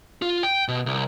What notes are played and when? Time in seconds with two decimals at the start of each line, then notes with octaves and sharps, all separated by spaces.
0.22 F4
0.43 G5
0.68 B2
0.86 C2